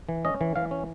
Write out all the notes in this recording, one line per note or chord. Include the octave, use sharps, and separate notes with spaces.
E3
C#4 D#5
E3
E3 F5
C#4